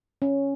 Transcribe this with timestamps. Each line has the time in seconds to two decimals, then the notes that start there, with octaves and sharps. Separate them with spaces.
0.22 C#4